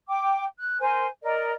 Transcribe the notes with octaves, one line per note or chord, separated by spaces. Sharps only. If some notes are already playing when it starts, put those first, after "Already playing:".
G5 D6
F#6
A#4 C5 G#5
A#4 D5 D#5